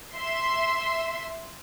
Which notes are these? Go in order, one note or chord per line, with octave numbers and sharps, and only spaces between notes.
E5 C6